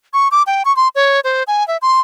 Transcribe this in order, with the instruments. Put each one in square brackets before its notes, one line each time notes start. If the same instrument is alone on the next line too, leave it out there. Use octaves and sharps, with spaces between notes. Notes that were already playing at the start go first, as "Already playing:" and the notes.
[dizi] C#6
D6
G5
C#6
C6
C#5
C5
G#5
E5
C6